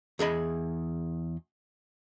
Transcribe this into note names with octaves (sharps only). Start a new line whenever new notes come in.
E2 G#4 D#5 B5